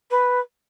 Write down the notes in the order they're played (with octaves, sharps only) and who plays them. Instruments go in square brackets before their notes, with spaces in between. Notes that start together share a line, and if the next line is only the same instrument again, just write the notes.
[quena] B4